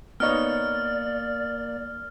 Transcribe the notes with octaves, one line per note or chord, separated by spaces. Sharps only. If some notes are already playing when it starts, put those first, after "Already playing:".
A#3 B3 D#4 C#5 D5 F6